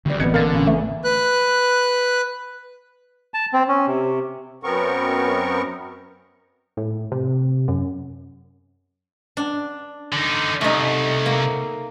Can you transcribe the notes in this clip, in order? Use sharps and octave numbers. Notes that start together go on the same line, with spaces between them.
D2 D3 G3 D5
A1 E3 B3 C4 D#5 F#6 G#6 C#7
A#2 D3 A#4 F5 A6
C#3
E2 A3
B4 F#6
A5
C4
C#4
C3
F#2 B3 C4 A#4 C#6
A2
C3
F#2
D4
D3 D#4
C2 A3 D#4
A#3